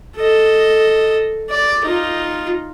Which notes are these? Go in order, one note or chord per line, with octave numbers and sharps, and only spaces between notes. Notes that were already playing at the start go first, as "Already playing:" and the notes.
A4 D#5
D5
D#4 F4